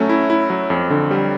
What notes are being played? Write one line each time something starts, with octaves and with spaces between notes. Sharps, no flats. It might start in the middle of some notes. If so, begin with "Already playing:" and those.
Already playing: F#3 A3 C#4
E4
E4
F#3
F2
D3
G3